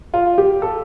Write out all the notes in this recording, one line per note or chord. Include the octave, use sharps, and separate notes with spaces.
F4
G4
A4